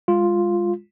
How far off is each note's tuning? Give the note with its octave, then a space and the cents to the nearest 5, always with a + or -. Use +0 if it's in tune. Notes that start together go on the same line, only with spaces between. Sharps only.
G#3 -30 F4 +0